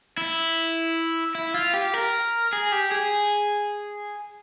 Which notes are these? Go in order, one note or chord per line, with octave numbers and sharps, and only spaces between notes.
E4
E4
F4
G4
A#4
G#4
G4
G#4